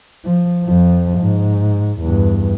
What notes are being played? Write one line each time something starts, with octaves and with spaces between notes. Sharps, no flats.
F3
F2 F3
G#2
E2 G2